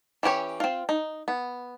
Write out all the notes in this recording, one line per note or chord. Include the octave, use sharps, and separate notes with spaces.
E3 C#4 G4 C#5
C4 F4
D#4
B3